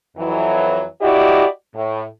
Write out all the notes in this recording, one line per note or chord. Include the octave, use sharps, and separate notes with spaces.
F2 E3 F#3
E4 F#4 G4 D5 D#5
A2